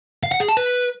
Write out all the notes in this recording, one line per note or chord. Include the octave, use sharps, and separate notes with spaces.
F5
F#5
G#4
A5
B4